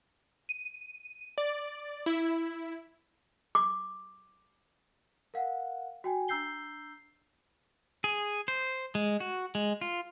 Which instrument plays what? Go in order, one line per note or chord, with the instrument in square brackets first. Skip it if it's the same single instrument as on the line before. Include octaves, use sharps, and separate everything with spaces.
[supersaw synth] D#7
D5
E4
[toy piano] D6
[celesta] A#4 F5 F#5
F#4 G5 G#5
D4 A#5 E6 G6 C7 G7
[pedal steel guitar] G#4
C5
G#3
F#4
G#3
F4